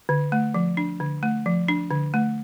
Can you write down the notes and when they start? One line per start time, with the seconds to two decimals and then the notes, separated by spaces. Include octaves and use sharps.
0.09 D3
0.32 A3
0.54 F3
0.77 D4
1.00 D3
1.23 A3
1.46 F3
1.68 D4
1.91 D3
2.14 A3